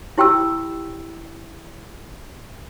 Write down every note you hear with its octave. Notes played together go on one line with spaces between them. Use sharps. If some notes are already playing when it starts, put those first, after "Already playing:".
E4 G4 G5 B5 E6